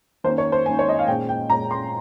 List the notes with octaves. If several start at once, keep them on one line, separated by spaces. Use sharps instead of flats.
D#3 A#3 C#4 C5
C#5
C5
D#3 A#3 C#4 G#5
C#5
D#5
F5
A#2 G#3 C#4 G5
G5
A#2 G#3 C#4 A#5
C6